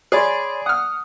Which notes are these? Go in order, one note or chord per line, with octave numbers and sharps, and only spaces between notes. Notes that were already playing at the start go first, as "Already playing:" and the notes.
G#4 C#5 D5 B5 C6
F#5 D#6 F6